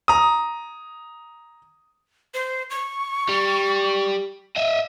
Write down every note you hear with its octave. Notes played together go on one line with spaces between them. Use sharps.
A#5 D#6
C5
C#6
G3
D#5 E5